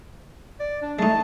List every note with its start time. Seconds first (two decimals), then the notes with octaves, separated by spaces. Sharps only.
0.60 D5
0.82 D4
0.99 G#3 A3 D#4 A5